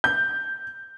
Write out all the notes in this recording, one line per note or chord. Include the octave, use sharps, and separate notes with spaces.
G6